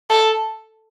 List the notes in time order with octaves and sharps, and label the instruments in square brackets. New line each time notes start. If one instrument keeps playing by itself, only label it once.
[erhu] A4